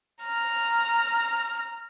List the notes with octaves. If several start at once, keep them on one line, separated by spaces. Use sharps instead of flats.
A#5 F6